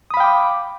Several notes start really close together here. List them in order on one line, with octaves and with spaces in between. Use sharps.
D#6 B5 F5 G5 D6